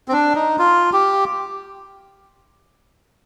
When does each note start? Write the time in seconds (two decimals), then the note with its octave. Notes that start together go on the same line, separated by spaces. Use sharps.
0.08 C4
0.12 D4
0.35 D#4
0.59 F4
0.93 G4